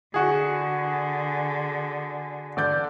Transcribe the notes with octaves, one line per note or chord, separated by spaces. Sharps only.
D3 F#4 G#4
D3 D5 G6